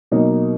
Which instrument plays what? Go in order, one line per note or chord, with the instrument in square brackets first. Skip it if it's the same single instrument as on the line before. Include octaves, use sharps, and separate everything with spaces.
[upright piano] B2 F#3 A#3 D#4